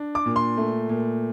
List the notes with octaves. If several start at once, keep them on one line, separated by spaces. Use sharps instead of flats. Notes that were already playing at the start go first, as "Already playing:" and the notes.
Already playing: D4
D6
A#2
C6
A3
A#2